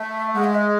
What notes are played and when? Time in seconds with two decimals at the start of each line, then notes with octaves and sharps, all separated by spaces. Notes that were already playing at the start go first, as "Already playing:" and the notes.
Already playing: A3 E5
0.35 G#3 F#5
0.44 E5
0.55 D#5